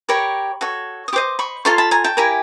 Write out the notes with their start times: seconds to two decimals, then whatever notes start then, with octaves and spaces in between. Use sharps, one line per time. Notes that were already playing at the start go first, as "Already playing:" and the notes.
0.09 G4 A#4 C#5 B5 C#6
0.61 F#4 A4 C#5
1.08 D#6
1.13 G4 C5 D#5 C6 D6
1.39 B5 C#6
1.65 F4 A4 C#5 A#5 C6
1.78 A5 B5
1.91 G#5 A#5
2.04 G5 A5
2.17 E4 G4 A#4 G#5 A#5